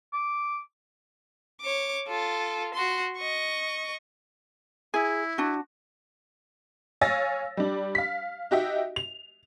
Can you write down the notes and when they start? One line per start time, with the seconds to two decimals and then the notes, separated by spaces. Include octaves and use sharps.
0.13 D6
1.62 C#5 D6
2.08 F4 A4
2.74 F#4 C6
3.17 D#5 C#6
4.94 E4 G#4
5.38 D4 F#4
7.01 C#5 F5 G#5 E6 A6 A#6
7.57 G3 D4
7.95 F5 B6
8.51 D#4 F#4 G4 E5
8.96 F7